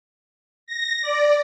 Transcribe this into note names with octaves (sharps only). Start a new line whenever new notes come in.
A#6
D5